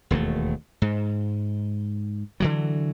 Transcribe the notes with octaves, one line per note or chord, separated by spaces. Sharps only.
E1 D#2 F3 A3
G#2
D3 E3 F#3